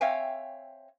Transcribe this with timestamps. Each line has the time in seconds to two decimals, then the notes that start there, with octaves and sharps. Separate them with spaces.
0.01 C4 C#5 E5 F5 G5 G#5